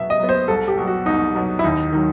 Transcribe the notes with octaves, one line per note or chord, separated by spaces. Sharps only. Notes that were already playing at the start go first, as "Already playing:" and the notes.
Already playing: B2 F#3 B3 E5
D#5
F#3 B3
C5
C2 A4
G4
B2 F#3
F#4
C2 D#4
B2 F#3
E4
D#2 D#4
D#3 F#3